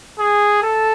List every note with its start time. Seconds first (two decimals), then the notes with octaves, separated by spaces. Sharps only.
0.19 G#4
0.63 A4